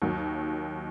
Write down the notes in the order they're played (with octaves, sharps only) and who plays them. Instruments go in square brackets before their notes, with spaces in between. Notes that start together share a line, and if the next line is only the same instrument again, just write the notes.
[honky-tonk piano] D#2 D#3 F#3